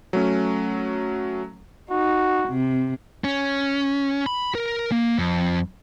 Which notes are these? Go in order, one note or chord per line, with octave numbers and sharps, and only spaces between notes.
F#3 A3 C#4
D#4 F#4
C3
C#4
B5
A#4
A#3
F2